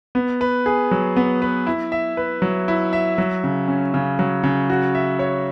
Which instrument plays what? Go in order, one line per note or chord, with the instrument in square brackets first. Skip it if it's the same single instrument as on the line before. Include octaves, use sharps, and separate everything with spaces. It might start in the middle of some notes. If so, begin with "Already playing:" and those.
[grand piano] B3
B4
G#4
F#3
B3
B4
E4
E5
B4
F#3
E4
E5
F#3
C#3
C#4
C#3
F#3
C#3
F#4
E5
C#5